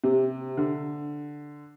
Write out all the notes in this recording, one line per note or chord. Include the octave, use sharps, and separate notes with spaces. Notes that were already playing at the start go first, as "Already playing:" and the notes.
C3
D3